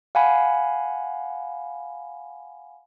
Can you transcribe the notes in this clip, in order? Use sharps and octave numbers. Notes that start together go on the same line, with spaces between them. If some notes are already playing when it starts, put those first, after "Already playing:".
F5 F#5 G#5 B5